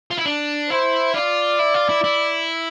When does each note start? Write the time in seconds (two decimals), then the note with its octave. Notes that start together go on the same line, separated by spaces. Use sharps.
0.11 F4
0.18 E4
0.26 D4
0.70 E4 C5
1.14 F4 D5
1.59 E4
1.74 F4
1.89 E4
2.04 E4